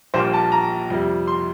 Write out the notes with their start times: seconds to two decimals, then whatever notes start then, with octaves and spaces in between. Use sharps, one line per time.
0.14 A#1 A#2 G3 A#3 C5
0.34 A5
0.52 A#5
0.90 F2 C3 G3
1.27 C6